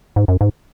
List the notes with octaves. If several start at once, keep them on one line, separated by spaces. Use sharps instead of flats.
G#2
F#2
G#2